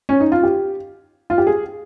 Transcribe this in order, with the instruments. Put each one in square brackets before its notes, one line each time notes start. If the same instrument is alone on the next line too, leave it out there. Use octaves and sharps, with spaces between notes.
[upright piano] C#4
D#4
F4
G4
F4
G4
G#4